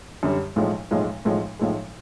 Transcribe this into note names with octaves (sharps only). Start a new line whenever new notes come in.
F#2 D3 G3
B1 A2 F3 G#3
B1 A2 F3 G#3
B1 A2 F3 G#3
B1 A2 F3 G#3